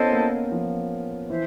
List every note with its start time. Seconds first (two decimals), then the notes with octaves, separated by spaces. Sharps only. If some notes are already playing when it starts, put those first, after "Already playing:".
Already playing: B3 C#4 E4 A4 C5 D#5
0.12 A#3
0.52 F3
1.29 E3 C5 E5